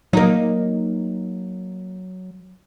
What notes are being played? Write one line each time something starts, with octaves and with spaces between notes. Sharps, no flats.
F#3 A#3 D#4